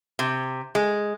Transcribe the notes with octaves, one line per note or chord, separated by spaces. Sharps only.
C3
G#3